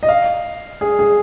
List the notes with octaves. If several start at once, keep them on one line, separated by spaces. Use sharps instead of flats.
D#5
F5
G#4
G#4